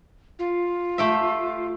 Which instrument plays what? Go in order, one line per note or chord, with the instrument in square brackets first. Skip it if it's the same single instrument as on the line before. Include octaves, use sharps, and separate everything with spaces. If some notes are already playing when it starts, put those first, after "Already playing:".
[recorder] F4
[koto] A3 G4 E5